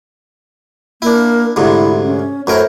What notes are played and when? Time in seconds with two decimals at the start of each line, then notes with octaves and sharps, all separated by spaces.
1.02 A#3 D4 E4
1.56 D2 G#2 C3 E4
2.03 C#4
2.47 F#2 A2 A#4 C5